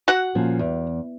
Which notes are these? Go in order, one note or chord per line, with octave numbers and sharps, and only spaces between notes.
F#4 F#5
A#2 F3 C#4
E2